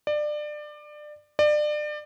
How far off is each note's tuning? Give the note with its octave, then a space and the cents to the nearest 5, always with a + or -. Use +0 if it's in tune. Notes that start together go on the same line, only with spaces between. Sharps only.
D5 +25
D5 +30